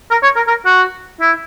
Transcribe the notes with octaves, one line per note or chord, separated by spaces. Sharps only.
A#4
C#5
A#4
A#4
F#4
E4